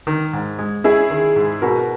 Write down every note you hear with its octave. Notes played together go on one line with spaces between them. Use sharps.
D#3
G#2
G#3
C#4 E4 G#4
D#3
G#2
B2 F#4 A#4